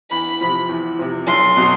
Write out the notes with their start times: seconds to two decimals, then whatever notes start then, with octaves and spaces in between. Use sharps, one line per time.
0.11 E2 B5
0.41 C3 F3
0.69 E2
0.99 C3 F3
1.28 B1 C6
1.57 B2 F#3